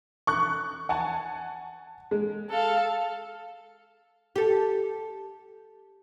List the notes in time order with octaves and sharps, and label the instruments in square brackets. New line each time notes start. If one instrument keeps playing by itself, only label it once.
[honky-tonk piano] C#6 F#6
F#5 G#5 A5
G#3
[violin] A4 F5
[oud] G4 A4